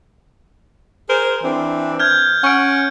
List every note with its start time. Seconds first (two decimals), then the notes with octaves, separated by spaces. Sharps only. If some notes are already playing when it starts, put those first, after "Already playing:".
1.10 G#4 A#4 C5
1.44 E3 C4 D4
1.99 F6 G6 G#6
2.44 C#4 F#5 C#6 D7